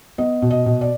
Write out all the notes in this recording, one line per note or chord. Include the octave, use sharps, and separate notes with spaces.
B3 D#5
B2
D#5
B2
D5